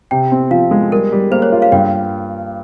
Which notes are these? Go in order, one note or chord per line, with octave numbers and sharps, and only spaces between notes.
C3 G5
C4
F3 F5
G#3
G3 A#4
G3
A#3 C5
C#5
F4
F5
G2 G5